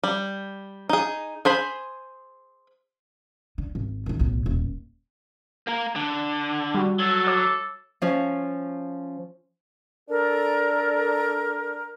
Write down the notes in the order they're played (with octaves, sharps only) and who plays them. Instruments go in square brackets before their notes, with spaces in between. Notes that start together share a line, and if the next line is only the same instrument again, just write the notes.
[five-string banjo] G3
D#4 G#4
G#4 C5 B5
[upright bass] D3
G#1
D#3 D#4
B1 A2
D#1
[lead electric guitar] A#3 A#4
D3
[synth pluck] G3 F#4
[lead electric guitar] F#3 [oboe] A4
[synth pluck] C#5 D6 E6
[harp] F3 C#4
[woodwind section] D4 A4 A#4